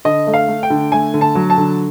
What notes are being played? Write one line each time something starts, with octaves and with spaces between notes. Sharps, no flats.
D3 D#5
A3
F5
A3
G5
D3
A3 G#5
D3
A5
F#3
A5
D3